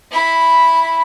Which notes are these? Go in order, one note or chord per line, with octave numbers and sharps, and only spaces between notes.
E4 B5